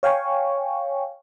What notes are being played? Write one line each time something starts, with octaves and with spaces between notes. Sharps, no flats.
C#5 F5 G5 G#5 C#6